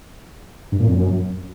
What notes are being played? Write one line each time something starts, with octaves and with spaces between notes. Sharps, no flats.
G2
A#2
F2
F#2